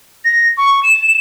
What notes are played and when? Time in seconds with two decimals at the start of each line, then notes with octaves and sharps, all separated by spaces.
0.25 A#6
0.58 C#6
0.83 E7